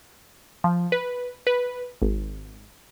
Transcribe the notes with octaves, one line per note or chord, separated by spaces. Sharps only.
F3
B4
B4
G#1